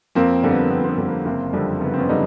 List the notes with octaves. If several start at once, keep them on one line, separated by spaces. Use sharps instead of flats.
F2 A#3 C4
D3 G3 A#3
B3
A#3
F2 B3
C4
B3
D3 G3
A#3
F#1 A#3 C4
F2 D3 G3
F#1 B3
C4
B3 C#4
D3 G3 D#4